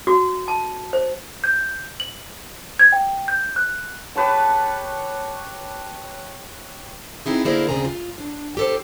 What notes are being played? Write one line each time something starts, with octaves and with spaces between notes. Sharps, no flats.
F#4
A5
C5
G6
F#7
G#6
G5
G6
F#6
G4 B4 C#5 A5
B3 C4 D#4 E4 G#4
D3 A#3 E4 G#4 A#4 C5
D2 C#3 C4 G#4 A#5
F4
D4
G4 A4 C5